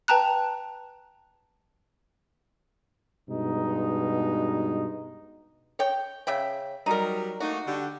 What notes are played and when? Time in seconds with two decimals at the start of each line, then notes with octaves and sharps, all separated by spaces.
0.08 B4 G5 A5 A#5 F#6
3.29 G2 B2 G#3 D#4
5.79 C#5 G5
6.27 C#3 E5 G5
6.86 F#3 G3 D#4 A#4
7.40 A3 A#3 D#4 F#4
7.66 D3 G4